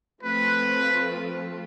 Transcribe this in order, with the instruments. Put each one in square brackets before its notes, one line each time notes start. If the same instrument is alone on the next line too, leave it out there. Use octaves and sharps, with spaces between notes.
[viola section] F3 A3 C4 F4 A4 [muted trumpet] B4